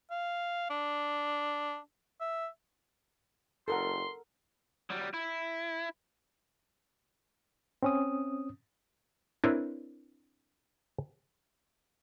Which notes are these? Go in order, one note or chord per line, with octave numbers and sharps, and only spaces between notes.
F5
D4
E5
F#1 A4 A#4 F#5 C6
F#3 G3
E4
C4 C#4 D#6
C4 D4 E4 A#4 B4 C#5